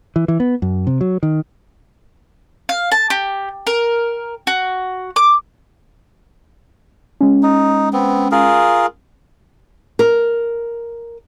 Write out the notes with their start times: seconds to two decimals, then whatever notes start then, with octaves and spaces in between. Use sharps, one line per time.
0.16 E3
0.28 E3
0.40 B3
0.62 F#2
0.87 C3
1.01 F#3
1.23 D#3
2.69 F5
2.92 A5
3.10 G4
3.67 A#4
4.47 F#4
5.16 D6
7.21 G#3 C#4
7.43 D#4
7.93 B3 C4
8.31 F4 G#4 A#4
9.99 A#4